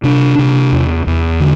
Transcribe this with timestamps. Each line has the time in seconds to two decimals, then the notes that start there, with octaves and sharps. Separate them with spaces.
0.04 C3 D4
0.39 C3
0.72 E2
1.07 E2
1.40 D3